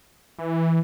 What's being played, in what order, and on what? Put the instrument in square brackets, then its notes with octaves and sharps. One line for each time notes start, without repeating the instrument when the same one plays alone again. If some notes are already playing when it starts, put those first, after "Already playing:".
[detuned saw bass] E3